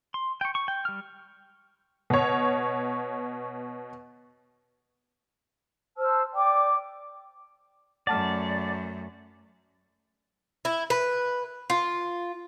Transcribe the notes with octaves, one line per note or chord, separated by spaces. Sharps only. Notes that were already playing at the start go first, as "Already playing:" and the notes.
C6
G5 C#6
C#6
G5
G3 F6
B2 C#5
C5 A5 E6 F6
D5 G5 D6
F#2 A3 D5 F#5 A5 F6
E4
B4
F4